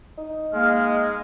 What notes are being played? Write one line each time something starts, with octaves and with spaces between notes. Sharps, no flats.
D#4
G#3 A#3 F6